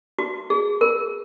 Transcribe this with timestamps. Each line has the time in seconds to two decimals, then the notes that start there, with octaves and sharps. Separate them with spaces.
0.19 F#4
0.50 G#4
0.81 A#4